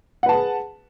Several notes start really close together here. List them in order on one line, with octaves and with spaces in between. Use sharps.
F#5 B4 A5 G#4